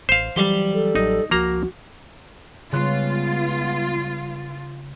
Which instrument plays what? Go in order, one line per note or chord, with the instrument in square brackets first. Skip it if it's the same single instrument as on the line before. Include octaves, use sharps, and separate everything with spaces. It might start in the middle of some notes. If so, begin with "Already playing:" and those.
[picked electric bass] A1 [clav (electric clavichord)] C5 F5
[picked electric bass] E3 F#3 [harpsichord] G3 G4 C6
[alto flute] A4
[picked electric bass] A1 F#3 [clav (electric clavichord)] D#4
[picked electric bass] C#2 F3 [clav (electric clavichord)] A#3 A#5 [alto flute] F#4
[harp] C#3 F#6 [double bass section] G3 G#3 B3 [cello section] F4